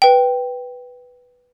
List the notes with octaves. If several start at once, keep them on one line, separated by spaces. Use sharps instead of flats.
B4 G5